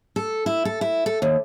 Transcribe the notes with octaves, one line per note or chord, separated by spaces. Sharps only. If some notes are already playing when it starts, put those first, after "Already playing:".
A4
E4
A4
E4
A4
D#2